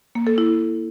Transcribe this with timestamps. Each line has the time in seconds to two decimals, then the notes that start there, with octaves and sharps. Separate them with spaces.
0.15 A#3
0.27 A4
0.38 E4